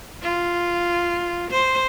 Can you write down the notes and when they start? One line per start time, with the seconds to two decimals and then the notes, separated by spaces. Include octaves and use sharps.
0.22 F4
1.51 C5